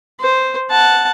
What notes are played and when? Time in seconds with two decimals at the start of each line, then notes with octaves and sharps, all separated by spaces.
0.20 C5
0.71 F#5 A5